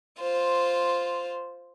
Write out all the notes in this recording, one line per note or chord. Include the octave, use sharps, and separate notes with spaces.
F4 C5